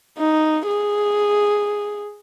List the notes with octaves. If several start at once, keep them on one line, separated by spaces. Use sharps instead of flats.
D#4
G#4